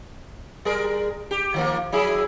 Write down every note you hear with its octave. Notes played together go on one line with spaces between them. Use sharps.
G3 G#4 A#4
G4
D#3 F3 A#3
F#3 E4 G#4